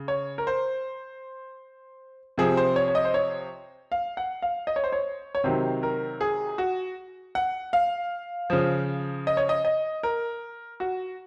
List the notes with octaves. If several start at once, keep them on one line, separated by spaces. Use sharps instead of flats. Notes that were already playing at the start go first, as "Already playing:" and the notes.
Already playing: C#3
C#5
A#4
C5
C3 F3 G#4
C5
C#5
C#5
D#5
C5
C#5
F5
F#5
F5
D#5
C#5
C5
C#5
C#5
C3 D#3 F#3 C5
A#4
G#4
F#4
F#5
F5
C#3 F3
D#5
C#5
D#5
D#5
A#4
F#4